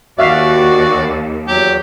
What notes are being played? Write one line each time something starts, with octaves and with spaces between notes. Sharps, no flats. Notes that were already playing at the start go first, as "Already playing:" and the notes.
D#2 F#4 D5 E5 F5
E2 F#3 G4